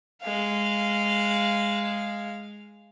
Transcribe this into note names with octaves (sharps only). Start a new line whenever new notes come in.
G#3 F5